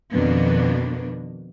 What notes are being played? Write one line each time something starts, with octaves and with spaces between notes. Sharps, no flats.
F2 B2 D#3 A#3 B3 D4